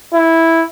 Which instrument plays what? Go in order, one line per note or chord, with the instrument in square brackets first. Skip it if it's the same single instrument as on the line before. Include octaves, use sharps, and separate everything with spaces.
[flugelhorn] E4